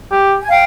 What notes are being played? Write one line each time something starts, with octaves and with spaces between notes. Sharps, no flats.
G4
G#5
F5 G5